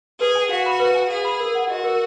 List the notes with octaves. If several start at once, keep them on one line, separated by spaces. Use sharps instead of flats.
G#4 B4
G#5
F#4 F5
B5
B4
G#5
G#4 F5
B5
A#4
F#5
F#4 D#5
A#4